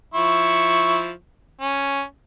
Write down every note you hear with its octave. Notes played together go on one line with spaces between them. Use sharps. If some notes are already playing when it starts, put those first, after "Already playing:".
F3 E4 C#6
C#4